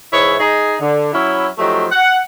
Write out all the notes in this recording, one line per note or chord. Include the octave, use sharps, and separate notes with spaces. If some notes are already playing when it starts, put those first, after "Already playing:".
G#2 E3 E4 G#4 C#5
D#4 G#4
D3
F#3 C#4 E4
F3 F#3 A3 D#4 G4
F#5